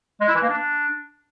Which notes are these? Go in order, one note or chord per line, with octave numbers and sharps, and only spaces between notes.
G#3
E4
E3
A#3
D4